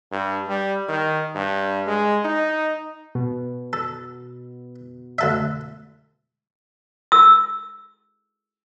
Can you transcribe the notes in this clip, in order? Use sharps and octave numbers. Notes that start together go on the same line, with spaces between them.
G2
G3
D#3
G2
G#3
D#4
B2
A4
D2 A4 E5
E6